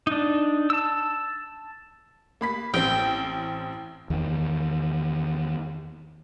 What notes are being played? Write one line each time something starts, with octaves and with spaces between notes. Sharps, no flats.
D4 D#4
A5 E6
A#3 B5 B6
A1 C4 G5
E2 D#3